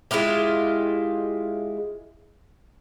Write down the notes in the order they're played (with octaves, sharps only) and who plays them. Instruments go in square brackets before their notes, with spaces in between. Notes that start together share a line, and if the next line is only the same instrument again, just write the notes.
[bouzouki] G#3 E4 F4 G4